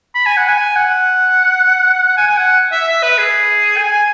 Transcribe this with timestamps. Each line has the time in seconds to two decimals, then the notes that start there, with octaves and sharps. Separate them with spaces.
0.15 B5
0.26 G#5
0.37 F#5
0.48 G#5
0.76 F#5
2.06 F#5
2.17 G#5
2.29 G#5
2.37 F#5
2.72 E5
2.88 E5
3.03 B4
3.18 G#4
3.78 G#5
3.92 G#5